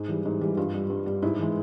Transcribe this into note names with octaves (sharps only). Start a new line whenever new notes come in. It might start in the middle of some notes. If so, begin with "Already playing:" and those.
Already playing: G#2 G#4
E3 G3
G#2
E3 G3
G2 F4
G3
G2
G3
G#2 E4
E3 G#3